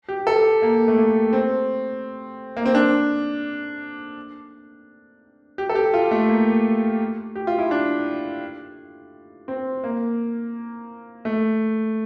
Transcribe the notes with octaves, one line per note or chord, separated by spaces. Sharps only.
G4
A4
A#3
A3
A#3
C4
A#3
C4
D4
G4
A4
G4
F4
A3
A#3
G4
F4
E4
D4
C4
A#3
A3